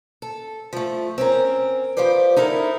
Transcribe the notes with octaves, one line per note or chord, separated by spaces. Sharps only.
A4
F3 A3
C4 C#4 A#4
F3 G4 B4 C5 D5
D#4 E4 A4 A#4